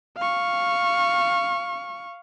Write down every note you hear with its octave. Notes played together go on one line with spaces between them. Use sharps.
F5 C#6